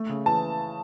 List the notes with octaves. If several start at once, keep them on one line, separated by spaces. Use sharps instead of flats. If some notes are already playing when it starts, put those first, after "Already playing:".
Already playing: A3
C#3
E3 A5